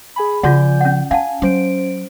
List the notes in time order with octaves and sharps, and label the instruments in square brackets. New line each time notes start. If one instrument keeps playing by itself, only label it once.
[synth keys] G#4 G#5 B5
[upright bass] C#3 F3 [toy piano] F4 F#4 F#5 [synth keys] D5 G#5 G6
[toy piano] C#4 F#5
[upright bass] C#4 [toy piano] F5 F#5 A5 [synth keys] G#5
[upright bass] F#3 [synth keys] C#4 C5 D7